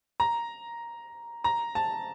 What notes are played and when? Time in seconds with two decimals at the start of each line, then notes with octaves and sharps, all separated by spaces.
0.20 A#5
1.44 A#5
1.75 A5